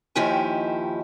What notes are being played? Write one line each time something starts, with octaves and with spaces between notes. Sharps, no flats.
D#2 D#3 F3 E4 G4 G#5